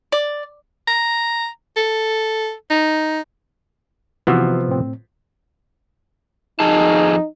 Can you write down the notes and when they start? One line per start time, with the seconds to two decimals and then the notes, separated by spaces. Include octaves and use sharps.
0.12 D5
0.87 A#5
1.77 A4
2.70 D#4
4.27 C3 E3 F3 B3 F#4 E6
4.68 A2 C4
6.60 F2 D#4 G#4 A5